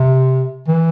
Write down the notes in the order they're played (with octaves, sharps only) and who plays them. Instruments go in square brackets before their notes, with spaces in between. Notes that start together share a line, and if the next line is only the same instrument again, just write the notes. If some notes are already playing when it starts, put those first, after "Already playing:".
Already playing: [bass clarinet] C3
E3